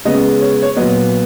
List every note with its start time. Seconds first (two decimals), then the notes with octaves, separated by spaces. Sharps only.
0.05 C#3 G#3 B3 D#5
0.42 C#5
0.63 C#5
0.77 A#2 F#3 B3 D#5